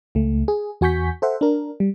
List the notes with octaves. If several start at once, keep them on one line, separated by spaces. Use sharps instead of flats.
C#2 A3
G#4
E2 F#4 G#5 C#6 G6 B6
A4 C5 E5 F#5
D4 A#4
G3